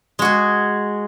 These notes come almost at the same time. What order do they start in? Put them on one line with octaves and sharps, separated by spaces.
G#3 F#4 G#4